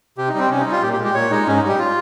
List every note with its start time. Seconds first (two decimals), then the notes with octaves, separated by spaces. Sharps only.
0.18 C3 G4
0.29 D#4
0.34 G3 C4
0.50 C3 C#4
0.61 D#4
0.66 G3
0.72 F4
0.83 A#2 G4
0.93 G4
0.98 G#3
1.04 G4
1.14 A#2 C#5
1.31 G#3 D#4
1.47 G#2 C#4
1.57 D#4
1.63 G3
1.68 G4
1.79 F4